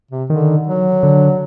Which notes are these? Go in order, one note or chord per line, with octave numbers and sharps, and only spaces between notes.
C3
D3 D#3
F#3
D3